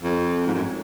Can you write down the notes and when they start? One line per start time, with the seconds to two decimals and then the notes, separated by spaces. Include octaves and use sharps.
0.03 F2
0.47 G#2
0.54 F#2